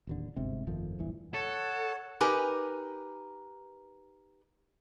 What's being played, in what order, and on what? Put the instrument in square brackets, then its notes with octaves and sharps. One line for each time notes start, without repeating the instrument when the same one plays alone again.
[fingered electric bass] D1 D#2 D3
G1 G#2 C3
G1 F2 D#3 F3
D1 G1 G2 E3
[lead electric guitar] A4 [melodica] C#5 [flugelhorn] F#5
[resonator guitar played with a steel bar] D#4 G4 A#4 B4 G#5